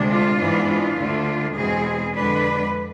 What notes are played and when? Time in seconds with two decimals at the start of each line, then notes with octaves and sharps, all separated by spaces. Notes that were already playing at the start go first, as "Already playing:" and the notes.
Already playing: D2 C3 G#3 D4
0.08 F4
0.38 G#2 E3 B3 D4
0.68 F4
0.96 D2 D3 A3 D4
1.54 E2 B2 G#3 C4 G#4
2.14 F2 D3 G#3 D4 B4